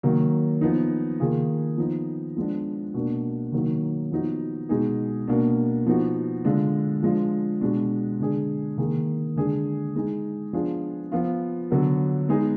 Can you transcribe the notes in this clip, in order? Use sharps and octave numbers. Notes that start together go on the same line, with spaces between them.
D#3 F#3 A#3
F3 B3 D#4
D#3 A#3 F4 G#4
F3 B3 D#4
F3 G#3 B3 D4
B2 A#3 D4
D#3 F#3 A#3 D#4
F3 B3 D#4 F#4
B2 G#3 D#4 G#4
B2 A#3 D4
F3 B3 D#4 F#4
D3 G#3 D4 F4
F3 G#3 D4 F4
B2 G#3 D4
D3 G#3 D4 G#4
D#3 A#3 D#4 G#4
D3 G#3 D4 G#4
G#3 D#4 G#4
F3 B3 D4 F4 G#4
F3 B3 F4
D3 F#3 B3
G#3 B3 D#4 G#4